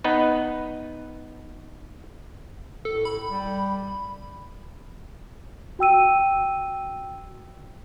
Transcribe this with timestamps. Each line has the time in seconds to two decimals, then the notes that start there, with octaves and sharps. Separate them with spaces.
0.04 B3 D#4 B4
2.85 A2 A4
3.05 B5
3.26 G3
5.79 F#4 G5 E6 D#7